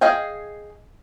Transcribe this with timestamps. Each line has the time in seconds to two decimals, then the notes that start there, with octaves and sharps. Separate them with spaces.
0.01 G#4 D#5 F5 G5 G#5